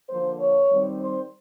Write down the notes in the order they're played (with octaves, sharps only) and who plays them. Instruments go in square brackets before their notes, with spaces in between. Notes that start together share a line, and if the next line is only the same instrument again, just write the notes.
[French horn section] D3 F3 A#3 C5
C#5
D#3 G3 C4
C5